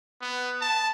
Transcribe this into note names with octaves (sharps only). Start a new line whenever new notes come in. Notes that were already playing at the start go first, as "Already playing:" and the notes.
B3
A5